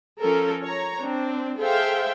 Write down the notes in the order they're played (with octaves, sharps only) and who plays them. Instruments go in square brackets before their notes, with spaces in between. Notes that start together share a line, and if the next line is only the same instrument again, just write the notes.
[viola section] F3 C#4 A4 A#4
C#5 A#5
C4 D4
G#4 A4 C5 E5 F5 G5